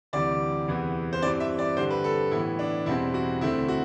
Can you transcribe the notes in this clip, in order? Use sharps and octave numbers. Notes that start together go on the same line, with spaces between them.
D2 C3 E3 G3 D5
E2 C3 E3 B3
C5
G2 E3 G3 C4 D5
E5
D5
G2 D3 G3 C5
B4
A4
A2 E3 B3 E4
D4
E2 B2 G3 C4 E4
F#4
D2 D3 A3 C4 E4
F#4